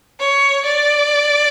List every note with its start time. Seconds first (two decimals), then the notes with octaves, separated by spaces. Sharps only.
0.20 C#5
0.65 D5